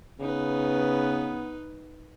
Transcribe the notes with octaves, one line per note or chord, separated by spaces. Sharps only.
C#3 B3 D#4 B4